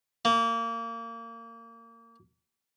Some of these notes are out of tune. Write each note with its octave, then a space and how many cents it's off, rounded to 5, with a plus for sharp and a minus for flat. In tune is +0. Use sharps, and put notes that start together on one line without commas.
A#3 -25